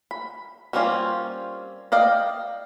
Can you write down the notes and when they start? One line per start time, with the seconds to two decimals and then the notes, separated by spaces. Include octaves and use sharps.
0.11 B5
0.73 G3 A#3 C4 C#4 F4
1.92 D5 D#5 F5 G5